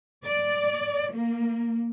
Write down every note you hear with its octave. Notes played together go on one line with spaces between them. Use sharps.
D5
A#3